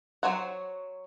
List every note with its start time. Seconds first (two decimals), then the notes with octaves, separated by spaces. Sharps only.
0.23 F#3 C5 C#5 F#5